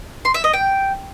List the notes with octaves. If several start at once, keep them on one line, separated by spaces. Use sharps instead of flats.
C6
E5
D#5
G5